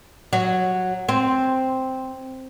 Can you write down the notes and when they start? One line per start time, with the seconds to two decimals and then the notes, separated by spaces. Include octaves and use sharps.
0.33 F#3
1.09 C4